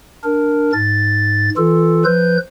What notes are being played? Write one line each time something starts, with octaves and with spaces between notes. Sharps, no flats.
D4 A#4
G#2 A6
E3 F4 A4
F3 B4 G6